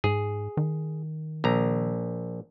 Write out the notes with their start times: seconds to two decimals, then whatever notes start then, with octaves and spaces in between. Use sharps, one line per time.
0.04 G#2 G#4
0.57 D#3
1.44 A#1 A#5